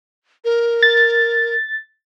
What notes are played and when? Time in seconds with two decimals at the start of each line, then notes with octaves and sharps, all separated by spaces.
0.45 A#4
0.83 A6